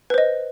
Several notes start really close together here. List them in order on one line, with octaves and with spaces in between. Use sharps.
B4 C5 D#5